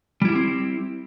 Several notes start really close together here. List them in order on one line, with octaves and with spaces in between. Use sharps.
G3 E4 F4 G4 C4